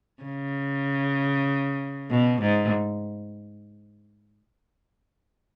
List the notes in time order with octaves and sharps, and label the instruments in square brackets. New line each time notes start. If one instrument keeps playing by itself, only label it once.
[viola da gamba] C#3
B2
G#2